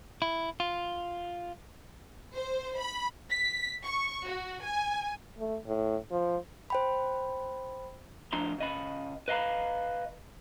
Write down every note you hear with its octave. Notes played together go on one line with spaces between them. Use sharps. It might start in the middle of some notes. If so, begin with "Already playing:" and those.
E4
F4
C5
B5
B6
C#6
F#4
G#5
A3
A2
F3
C5 G5 B5
D2 A2 F3 D4 A#5 C6
C#3 D#5 B5
B4 D#5 F5 A#5 B5